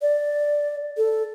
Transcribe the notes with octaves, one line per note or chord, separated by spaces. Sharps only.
D5
A4